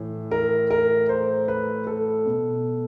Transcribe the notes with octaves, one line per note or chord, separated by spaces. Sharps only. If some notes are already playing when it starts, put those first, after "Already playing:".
Already playing: A2 E3
A#4
A#4
C5
B4
A4
B2